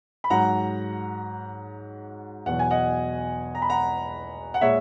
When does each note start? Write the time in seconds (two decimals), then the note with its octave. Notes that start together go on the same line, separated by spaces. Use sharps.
0.24 B5
0.30 G#2 F#3 F#5 A#5
2.46 E2 B2 F#3 F#5
2.59 G#5
2.71 D#5 F#5
3.55 A#5
3.62 B5
3.70 F#5 A#5
4.54 F#5
4.61 A#2 G#3 C#5 E5